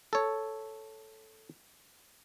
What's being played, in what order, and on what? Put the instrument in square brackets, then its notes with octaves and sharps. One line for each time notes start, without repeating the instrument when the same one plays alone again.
[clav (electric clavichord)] A4 C#5